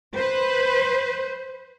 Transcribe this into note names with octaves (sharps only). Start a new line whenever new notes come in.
B4 C5